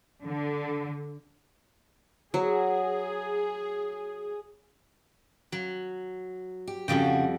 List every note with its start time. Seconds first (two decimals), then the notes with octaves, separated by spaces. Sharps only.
0.24 D3
2.34 F#3 G#4
5.52 F#3
6.67 G4
6.88 F2 C#3 G3 F#4 G5